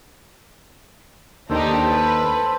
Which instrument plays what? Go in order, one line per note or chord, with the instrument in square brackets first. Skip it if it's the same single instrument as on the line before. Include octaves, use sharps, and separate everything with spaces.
[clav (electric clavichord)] D#2 D#3 [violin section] D4 D#4 G4 [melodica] A4 C5
[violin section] B4